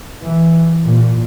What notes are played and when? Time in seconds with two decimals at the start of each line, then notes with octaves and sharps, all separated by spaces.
0.24 E3
0.87 A#2